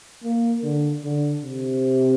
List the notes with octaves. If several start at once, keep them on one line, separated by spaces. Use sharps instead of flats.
A#3
D3
D3
C3